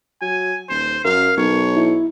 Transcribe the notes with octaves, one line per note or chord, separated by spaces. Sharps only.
F#3 G#5
D#1 C5
F#2 A#4 F5
B1 C#5
E4